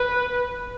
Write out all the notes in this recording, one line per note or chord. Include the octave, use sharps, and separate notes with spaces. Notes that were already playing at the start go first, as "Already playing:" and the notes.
Already playing: B4